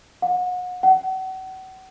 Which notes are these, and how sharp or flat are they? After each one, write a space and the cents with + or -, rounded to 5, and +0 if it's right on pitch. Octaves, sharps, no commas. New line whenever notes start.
F#5 -35
F#5 +35